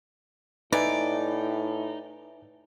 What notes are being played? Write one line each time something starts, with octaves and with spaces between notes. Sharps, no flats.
A2 D#4 B4 D5 E5 G#5